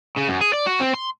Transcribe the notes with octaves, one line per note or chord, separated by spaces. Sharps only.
C#3
F#2
G#4
D5
F#4
C4
C6